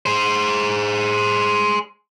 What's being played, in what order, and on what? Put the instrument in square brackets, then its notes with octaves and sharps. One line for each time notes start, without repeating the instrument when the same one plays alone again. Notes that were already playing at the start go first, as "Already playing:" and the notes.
[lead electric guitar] G#4 C5